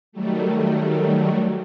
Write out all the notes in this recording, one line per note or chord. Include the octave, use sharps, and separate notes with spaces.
D#3 F#3 G3 A3